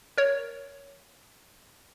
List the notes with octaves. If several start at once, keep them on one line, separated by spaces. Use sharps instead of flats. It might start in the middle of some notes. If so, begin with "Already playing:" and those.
A#4 C#5